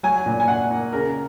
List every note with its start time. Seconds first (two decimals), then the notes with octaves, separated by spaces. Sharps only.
0.03 F#3 G#5
0.26 A#2
0.40 G#5
0.48 A#2 F#5
0.70 A#3
0.92 C#3 A#4